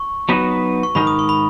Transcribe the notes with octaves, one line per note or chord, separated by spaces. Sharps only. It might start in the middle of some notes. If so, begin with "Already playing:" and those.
Already playing: C#6
F#3 B3 D#4 F#4 B4
C#6
G#2 D#3 G#3 D#4 A#4 B5
D#6
C#6
B5